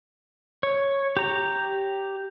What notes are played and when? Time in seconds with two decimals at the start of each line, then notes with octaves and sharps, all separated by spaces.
0.63 C#5
1.17 G4 A#5